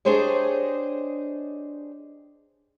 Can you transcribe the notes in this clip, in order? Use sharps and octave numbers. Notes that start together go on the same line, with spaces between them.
D4 G4 G#4 C5 C#5 D#5